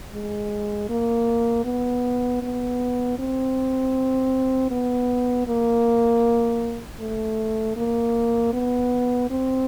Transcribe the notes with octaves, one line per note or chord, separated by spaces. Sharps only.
G#3
A#3
B3
B3
C4
B3
A#3
A3
A#3
B3
C4